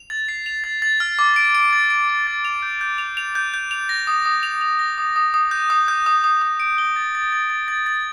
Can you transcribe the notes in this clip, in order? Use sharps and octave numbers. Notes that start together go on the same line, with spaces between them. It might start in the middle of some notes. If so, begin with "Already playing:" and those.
Already playing: F7
A6
C7
F7
A6
A6
F6
D6
D7
D7
A6
D7
D6
A6
F7
G6
G6
F7
F7
G6
G6
F7
A#6
D#6
D#6
F7
F7
A#6
D#6
D#6
D#6
G6
D#6
G6
D#6
D#6
D#6
D7
G7
A6
A6
A6
A6
A6
A6